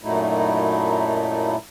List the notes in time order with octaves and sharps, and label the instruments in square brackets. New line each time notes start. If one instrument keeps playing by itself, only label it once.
[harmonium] F#2 A#2 F#3 A3 D#4 E4